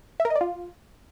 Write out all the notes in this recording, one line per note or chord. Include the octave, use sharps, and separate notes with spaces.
E5
A#4
D#5
D5
F4